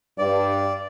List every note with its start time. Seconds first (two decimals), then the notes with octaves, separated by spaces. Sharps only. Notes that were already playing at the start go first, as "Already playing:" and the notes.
0.18 G2 D5